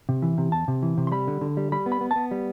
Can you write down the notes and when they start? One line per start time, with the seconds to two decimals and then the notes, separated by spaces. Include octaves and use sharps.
0.09 C3
0.22 E3
0.38 C3
0.52 E2 A5
0.68 C3
0.82 E3
0.98 C3
1.07 C6
1.12 G3 B5
1.27 D3
1.41 D3
1.57 G3
1.72 G3 B5
1.86 B3
1.92 B5
2.01 B3
2.11 A5
2.16 B3
2.31 G3